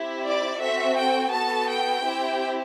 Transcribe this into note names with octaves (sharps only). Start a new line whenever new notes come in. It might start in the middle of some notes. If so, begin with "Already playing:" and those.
Already playing: C4 E4 G4
D5
C4 F#4 A4 E5
G5
B3 F#4 A4 A5
G5
C4 E4 G4